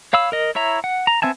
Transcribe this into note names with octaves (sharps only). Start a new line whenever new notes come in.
C#5 F5 B5 E6
A#4 D#5
E4 C#5 E5 A#5
F#5
A#5
B3 C4 E5 G#5 A5